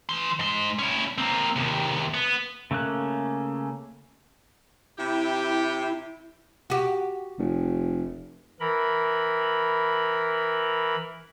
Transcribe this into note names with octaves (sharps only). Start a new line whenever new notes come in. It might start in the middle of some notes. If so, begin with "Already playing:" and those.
E3 C6
G#2 C6
C#4 E4
A#3 C4
D#2 C3
B3
C#3 A3 A#3 C#4 F#6
C3 E4 G4
F#4 G4
F1
E3 A#4 B5